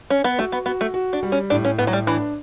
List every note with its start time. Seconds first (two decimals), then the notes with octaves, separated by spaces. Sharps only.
0.10 C#4
0.24 B3
0.38 A3 F#4
0.52 B3
0.66 B3 F#4
0.81 A3
0.94 F#4
1.13 D4
1.23 G3
1.32 C#4
1.50 A2 D4
1.65 C#4
1.78 A2 B3
1.87 F#3
1.93 G3
2.07 E3 D4